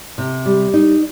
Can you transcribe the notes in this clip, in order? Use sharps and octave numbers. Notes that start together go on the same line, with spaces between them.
C3
G3
D#4